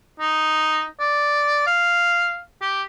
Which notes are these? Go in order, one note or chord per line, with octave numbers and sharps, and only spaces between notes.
D#4
D5
F5
G4